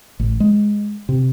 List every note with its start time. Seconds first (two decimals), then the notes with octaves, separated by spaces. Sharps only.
0.19 A1
0.40 G#3
1.09 C3